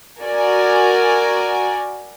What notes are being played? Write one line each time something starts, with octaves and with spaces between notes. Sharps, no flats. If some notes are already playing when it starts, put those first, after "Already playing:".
F#4 A#4 D5 G#5